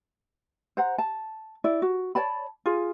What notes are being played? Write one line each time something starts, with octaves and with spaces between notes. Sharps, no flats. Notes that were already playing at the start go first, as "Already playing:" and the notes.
C5 F#5 A#5
A5
E4 D5
F#4
C#5 D5 A5 B5
F4 G#4